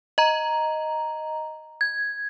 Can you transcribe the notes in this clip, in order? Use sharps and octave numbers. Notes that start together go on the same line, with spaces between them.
D#5 A#5
G#6